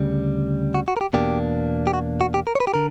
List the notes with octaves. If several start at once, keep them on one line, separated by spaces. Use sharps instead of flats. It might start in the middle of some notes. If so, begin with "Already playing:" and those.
Already playing: D2 C#3 G3
F#4
F#4
A#4
G4
E2 B2 A#3 D4 G4
G4
F#4
F#4
G4
A#4
C#5
B4
G4
D3 A#4